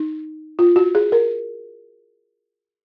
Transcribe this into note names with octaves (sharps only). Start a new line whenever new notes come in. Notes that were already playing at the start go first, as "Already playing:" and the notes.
Already playing: D#4
F4
F#4
G#4
A#4